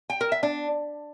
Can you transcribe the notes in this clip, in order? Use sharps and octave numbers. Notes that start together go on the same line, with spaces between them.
G5
A#4
E5
D4